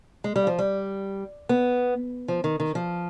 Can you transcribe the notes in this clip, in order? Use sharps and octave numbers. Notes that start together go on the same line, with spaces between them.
G#3
G3
F3
G3
B3
F3
D#3
D#3
F3